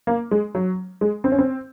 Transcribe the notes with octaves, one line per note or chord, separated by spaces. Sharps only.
A#3
G#3
F#3
G#3
C4
C#4
C4